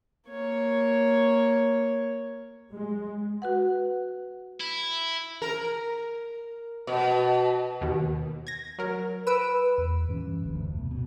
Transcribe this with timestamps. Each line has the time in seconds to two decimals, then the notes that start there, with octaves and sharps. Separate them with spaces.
0.30 A#3 C#5
2.71 G#3
3.42 F#4 B4 F#5
4.61 E4
5.42 A#4
6.87 B2
7.81 D#2 B2 D#3
8.47 G#6 A#6
8.79 F#3 A#4
9.27 B4 E6 D7 E7
9.78 E2
10.09 G2 E3 C#4
10.43 F1 D2
10.79 B2
10.91 B2